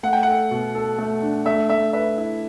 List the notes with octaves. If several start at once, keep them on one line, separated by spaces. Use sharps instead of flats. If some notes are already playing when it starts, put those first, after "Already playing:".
A3 F#5
G5
A4 F#5
B2
A4
A3
D4
A3 E5
A3 E5
B4 E5
E4